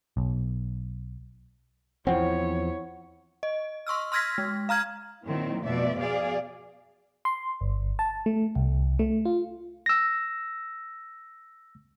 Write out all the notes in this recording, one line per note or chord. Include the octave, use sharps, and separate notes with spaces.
B1
E2 F3 C4 E4 C#5 F#5
D#5
C6 C#6 E6 F6
C6 E6 F6 G#6 A#6 B6
G#3
F5 A#5 F6 G#6
A#2 D#3 F#3 C4 E4
F2 B2 F3 A3 D5 E5
B2 G#4 D5 F5
C6
G1
A5
A3
C2
A3
F4
E6 A#6